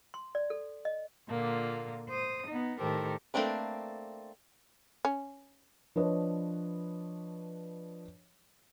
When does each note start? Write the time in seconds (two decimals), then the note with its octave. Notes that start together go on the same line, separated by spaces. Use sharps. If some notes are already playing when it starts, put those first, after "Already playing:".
0.14 C6
0.35 D5
0.50 A4
0.85 D#5
1.29 A#2 D3 A#3 F4
2.08 C5 D#6
2.48 B3 D#4
2.78 A2 D#3 G4 A4 A#4 C5
3.34 A3 A#3 C4 D4 B4
5.05 C#4
5.96 F3 D4 B4 C#5 D#5